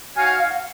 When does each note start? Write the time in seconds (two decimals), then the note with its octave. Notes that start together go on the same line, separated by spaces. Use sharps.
0.15 D#4 F#4 C#5 F5 G#5
0.27 F#5
0.38 F5
0.49 F#5